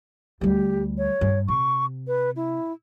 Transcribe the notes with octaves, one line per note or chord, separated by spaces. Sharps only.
D2 G3 G4
C#5
G2
C3 C#6
B4
E4